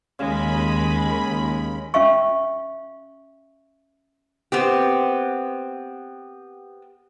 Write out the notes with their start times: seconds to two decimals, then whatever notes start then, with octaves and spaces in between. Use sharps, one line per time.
0.19 D#2 C#3 G#3 B5
1.94 C#4 E5 F5 C#6
4.52 B3 C4 G4